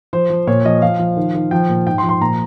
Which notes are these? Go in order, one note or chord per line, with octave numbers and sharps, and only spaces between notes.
F3 C5
F3
A#2 C#5
F3 D#5
F3 F5
F3
D#3
D#3
F3 G5
A#2
G#2 G5
C6
F3
C6
A#2 A#5